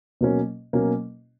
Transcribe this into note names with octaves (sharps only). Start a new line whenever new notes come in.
B2 F#3 A#3 C#4
B2 F#3 A#3 C#4